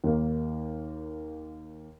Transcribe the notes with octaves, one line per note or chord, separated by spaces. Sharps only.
D#2 A#3